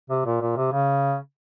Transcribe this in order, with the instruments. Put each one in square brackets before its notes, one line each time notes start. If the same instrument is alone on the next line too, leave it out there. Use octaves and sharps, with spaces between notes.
[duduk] C3
A#2
A#2
C3
C#3